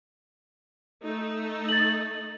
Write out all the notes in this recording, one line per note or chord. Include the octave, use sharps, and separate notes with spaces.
A3 D#4
A6 F#7